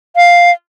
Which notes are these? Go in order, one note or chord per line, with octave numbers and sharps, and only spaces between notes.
F5